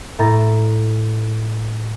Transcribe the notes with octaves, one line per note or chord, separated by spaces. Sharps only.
A2 A#5 A6